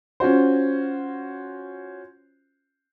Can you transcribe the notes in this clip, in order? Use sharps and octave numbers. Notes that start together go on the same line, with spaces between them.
C#4 F4 F#4 C5